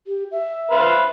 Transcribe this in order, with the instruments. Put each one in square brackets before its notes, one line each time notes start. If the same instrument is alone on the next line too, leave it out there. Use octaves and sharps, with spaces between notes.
[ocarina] G4
E5
[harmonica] B4 C5 F5